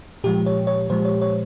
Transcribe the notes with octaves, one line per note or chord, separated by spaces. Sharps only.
A#2 F3 G#3 G4
C#5
C#5
A#2 F3 G#3 C5
C#5
C#5